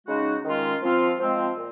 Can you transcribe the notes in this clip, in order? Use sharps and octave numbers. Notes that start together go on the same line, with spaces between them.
C#3 G#3 D#4 F#4
D#3 G#3 C#4 F4
F3 C4 F4
F3 G#3 C4
A#2